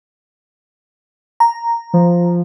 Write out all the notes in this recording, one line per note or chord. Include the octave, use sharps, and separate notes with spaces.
A#5
F3